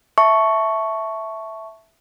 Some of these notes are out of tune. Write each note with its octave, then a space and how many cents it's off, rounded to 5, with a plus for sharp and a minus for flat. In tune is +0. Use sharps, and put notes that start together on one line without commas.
E5 +0 A5 +0 C#6 +0